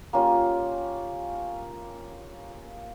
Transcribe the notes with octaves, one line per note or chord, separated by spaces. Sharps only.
A#3 C#4 F4 G4